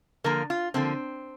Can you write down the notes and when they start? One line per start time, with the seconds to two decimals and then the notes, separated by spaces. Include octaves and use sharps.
0.24 D3 F3 A#3 A#4
0.50 F4
0.74 D3 F3 A#3 C4